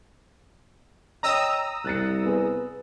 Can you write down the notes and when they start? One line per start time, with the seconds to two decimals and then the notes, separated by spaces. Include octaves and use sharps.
1.23 C#5 D#5 G5 A#5 D#6 E6
1.85 C2 F#6 A6 C#7
2.23 B3 G#4